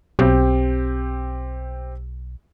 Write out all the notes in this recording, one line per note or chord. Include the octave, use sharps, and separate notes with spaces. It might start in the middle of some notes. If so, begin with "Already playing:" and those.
B1 C4 G4